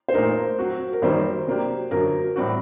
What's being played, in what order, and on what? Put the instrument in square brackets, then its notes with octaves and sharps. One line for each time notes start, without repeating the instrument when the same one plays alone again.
[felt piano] C5
[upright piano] A#2 A3 D#4 [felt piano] A#4
[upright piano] F#3 C4 F#4
[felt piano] A#4
[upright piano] F#2 D#3 G3 A#3 D#4 [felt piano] C5
[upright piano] C3 F#3 A#3 D4 G4
[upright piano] F#2 D3 F#3 [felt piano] A#4
[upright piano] A2 G3 C4 F#4